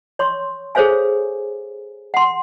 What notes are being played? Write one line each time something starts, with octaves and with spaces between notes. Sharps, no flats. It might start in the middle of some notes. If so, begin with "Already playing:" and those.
C#5 C6 C#6
G#4 A4 C5 C#5 F5 G#5
F#5 C6